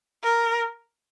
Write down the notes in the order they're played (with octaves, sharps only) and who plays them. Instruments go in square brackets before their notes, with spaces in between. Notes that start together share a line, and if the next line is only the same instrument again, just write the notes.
[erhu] A#4